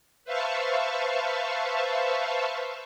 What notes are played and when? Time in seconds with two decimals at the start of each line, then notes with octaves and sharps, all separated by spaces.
0.25 B4 C5 E5 F5 A5 C#6